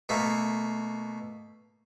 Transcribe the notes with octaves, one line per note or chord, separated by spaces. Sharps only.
B2 A3 A#3